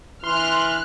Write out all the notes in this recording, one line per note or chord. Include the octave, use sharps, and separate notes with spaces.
E3 C6 F6 F#6